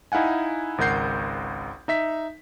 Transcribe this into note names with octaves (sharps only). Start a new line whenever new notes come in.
D#4 E4 F5 F#5 G#5
G#1 C#2 A#4 F#5 G6 C7
D#4 E5 B6